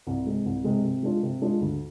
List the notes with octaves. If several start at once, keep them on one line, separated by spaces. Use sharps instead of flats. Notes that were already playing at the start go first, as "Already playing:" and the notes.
C2
C3 G#3
C2
C3 G#3
C3
G#3 D4 F4
C3
G#3 D4 F4
D2